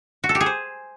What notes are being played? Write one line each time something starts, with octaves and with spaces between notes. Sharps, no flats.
F#4
A4
G4
G#4
C5